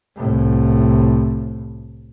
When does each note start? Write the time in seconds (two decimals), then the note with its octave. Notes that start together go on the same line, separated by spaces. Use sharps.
0.16 C2 A2